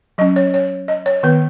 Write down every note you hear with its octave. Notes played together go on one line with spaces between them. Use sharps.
F#3 C#4 D#5
C#5
C#5
D#5
C#5
D#3 B3 B4